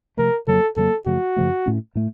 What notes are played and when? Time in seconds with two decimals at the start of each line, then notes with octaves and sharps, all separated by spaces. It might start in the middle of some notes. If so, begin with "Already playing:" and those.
0.17 C3 F3 A3 A#4
0.47 F2 C#3 F#3 A#3 A4
0.76 F2 C#3 F#3 A#3 A4
1.06 F#2 C#3 F3 A3 F#4
1.36 F#2 C#3 F3 A3
1.66 A2 A3 C#4
1.95 A2 A3